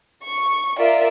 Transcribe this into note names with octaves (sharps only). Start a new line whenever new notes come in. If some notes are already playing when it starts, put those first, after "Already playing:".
C#6
F4 A#4 D5 E5